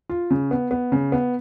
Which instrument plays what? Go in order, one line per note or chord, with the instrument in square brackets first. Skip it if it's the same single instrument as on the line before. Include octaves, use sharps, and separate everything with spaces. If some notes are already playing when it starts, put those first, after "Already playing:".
[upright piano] F4
C#3
B3
B3
C#3
B3